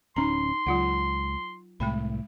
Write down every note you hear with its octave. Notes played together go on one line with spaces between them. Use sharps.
D1 C#4 D#4 A#5 C6
C#2 F#3 F4 F#5
C2 A2 G#3 G5 B5